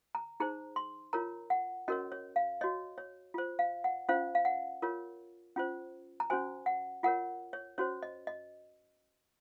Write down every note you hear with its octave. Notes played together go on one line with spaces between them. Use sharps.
A#5
D#4 G#4 C5 A#5
C6
F4 A#4 C#5 A#5
F#5
C#4 F#4 A#4 C#5 D#5
C#5
F5
F#4 C#5 D#5
C#5
F4 C5
F5
F#5
C#4 F4 C5 F5
F5
F#5
F4 A#4 C#5
C#4 F4 C5
A#5
C#4 F#4 C5 G#5
F#5
F4 A#4 C#5 F#5
C#5
C#4 F#4 C5 C#5
D#5
D#5